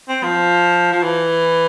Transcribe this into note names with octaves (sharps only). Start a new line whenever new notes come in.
C4
F3
F3
E3